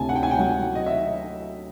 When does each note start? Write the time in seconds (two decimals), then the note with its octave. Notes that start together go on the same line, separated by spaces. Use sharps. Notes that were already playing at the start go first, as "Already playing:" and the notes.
Already playing: D2 C3 G#5 A5
0.09 F#5
0.16 G5
0.23 G#5
0.31 G5
0.39 F#3 F#5
0.75 D#5
0.86 E5